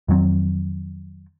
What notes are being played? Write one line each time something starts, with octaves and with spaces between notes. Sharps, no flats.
F2 D#3 F#3 C4